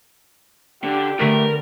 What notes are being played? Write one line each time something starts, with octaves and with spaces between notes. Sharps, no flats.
D3 G4
D3 A3 B3 A#4 A6